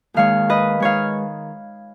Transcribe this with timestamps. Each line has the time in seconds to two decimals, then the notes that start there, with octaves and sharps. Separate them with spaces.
0.14 D#2 D#3 G#3 C#5 F5
0.49 B4 D#5
0.80 D#3 G#3 C#5 F5